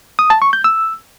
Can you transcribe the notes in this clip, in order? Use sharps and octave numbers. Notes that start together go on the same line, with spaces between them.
D#6
A5
C#6
G6
E6